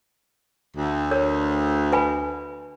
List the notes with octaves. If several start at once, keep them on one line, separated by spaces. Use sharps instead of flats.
D2
A#4 C#5
B4 G#5 B5